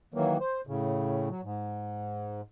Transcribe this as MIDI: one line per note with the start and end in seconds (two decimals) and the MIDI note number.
0.14 0.37 51
0.14 0.37 52
0.14 0.37 54
0.14 0.37 58
0.40 0.61 72
0.67 1.29 45
0.67 1.29 49
1.29 1.41 54
1.43 2.41 44